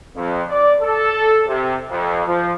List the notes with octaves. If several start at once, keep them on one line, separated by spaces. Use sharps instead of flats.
F2
D5
A4
C3
F2
F3